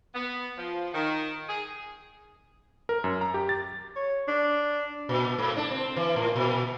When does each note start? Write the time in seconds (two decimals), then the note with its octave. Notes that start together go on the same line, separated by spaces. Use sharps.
0.15 B3
0.57 F3
0.94 D#3
1.49 G#4
2.89 A#4
3.04 F#2
3.21 A#5
3.34 G4
3.49 A6
3.96 C#5
4.28 D4
5.09 A#2
5.39 G#2
5.57 D4
5.71 C4
5.97 E3
6.16 A2
6.36 A#2